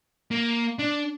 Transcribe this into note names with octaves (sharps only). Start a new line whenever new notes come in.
A#3
D4